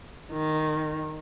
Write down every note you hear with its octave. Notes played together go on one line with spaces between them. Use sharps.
D#3